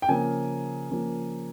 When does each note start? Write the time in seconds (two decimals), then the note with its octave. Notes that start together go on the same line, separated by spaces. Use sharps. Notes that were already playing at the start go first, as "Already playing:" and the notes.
0.02 G5
0.09 C#3 F3 A#3 G#5
0.91 C#3 F3 A#3